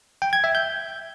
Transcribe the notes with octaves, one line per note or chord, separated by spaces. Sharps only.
G5
G#6
E5
G6